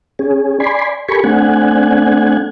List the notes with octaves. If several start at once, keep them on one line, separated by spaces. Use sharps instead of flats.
C#4 G#4
D5 G#5 B5 C6
G4 A4 A#4 G#5 B5 C#6
A3 C4 D4 F#5 G#5